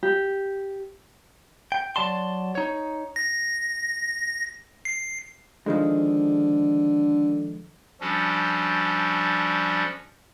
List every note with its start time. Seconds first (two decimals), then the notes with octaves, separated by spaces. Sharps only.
0.03 G4
1.72 G5
1.96 F#3 D5 A5 C6
2.55 D#4 C#5
3.16 A#6
4.85 C7
5.66 D3 D#3 F3 G#3
8.01 F3 G3 C#4 D4 F#4 A4